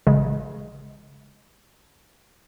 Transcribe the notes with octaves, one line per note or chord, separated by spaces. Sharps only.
A1 C#3 G#3